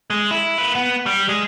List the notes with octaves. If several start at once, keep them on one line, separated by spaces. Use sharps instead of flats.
G#3
E4
A#3 B4
B3
G3
G#3